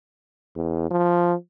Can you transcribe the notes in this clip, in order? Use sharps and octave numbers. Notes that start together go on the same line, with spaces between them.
E2
F3